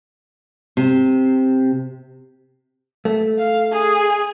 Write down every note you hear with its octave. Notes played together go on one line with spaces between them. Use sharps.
C3
A3
F5
G#4